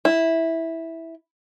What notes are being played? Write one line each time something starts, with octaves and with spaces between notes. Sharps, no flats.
E4